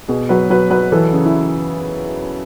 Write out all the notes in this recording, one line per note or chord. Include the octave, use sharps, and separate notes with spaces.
B2 G#4
F#3 B4
F#3 B4
F#3 B4
E3 A4
C#3 G#4
E4